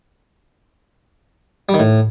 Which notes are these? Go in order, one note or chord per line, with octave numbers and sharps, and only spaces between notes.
G3
D#3
A2